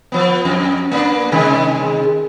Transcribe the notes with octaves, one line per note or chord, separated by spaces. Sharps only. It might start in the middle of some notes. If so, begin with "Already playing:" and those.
F3 B3
F2
A#3 B3 D4
C3 D#3 G#3